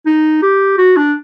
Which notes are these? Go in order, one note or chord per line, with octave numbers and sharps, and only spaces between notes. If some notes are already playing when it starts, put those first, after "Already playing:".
D#4
G4
F#4
D4